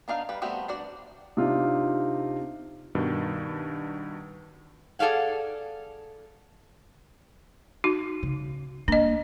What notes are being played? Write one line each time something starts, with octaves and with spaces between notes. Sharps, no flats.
B3 D4 D#4 F5
G3 B4
G3 A3 B3 C4 F#4
D4 F#4 D5
C3 D4 D#4 F4
G2 B2 D#3
G#4 A4 D5 F5 F#5
D#4 F#4
C#3
A#3 D4 D#5